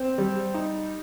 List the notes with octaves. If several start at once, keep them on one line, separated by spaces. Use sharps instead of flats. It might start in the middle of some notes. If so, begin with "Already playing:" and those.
Already playing: C4
G3
D#4